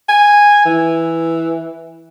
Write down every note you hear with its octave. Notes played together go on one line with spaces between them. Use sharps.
G#5
E3